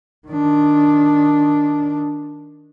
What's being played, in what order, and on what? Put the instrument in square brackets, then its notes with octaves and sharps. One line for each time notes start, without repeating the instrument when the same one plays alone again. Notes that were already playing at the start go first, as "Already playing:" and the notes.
[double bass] D#3 D4